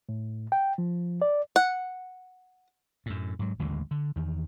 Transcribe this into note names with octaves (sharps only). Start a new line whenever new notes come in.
A2
G5
F3
D5
F#5
F#2 A2
G#2 F#3
A1 D#2 D3 G#3
D3
E2 D#3